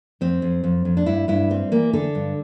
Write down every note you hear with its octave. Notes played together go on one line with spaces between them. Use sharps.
F2 C4
F2
F2
F2
D4
G2 E4
G2 E4
G3 C4
E3 A#3
D3 A4
G2